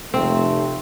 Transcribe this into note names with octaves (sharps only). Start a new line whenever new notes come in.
F1 A3 C4